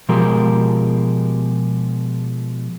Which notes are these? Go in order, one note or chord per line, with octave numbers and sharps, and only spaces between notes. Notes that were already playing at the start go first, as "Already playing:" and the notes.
B2 F3 G#3 G4 A#4